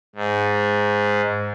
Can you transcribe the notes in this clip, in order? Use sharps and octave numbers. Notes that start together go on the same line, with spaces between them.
G#2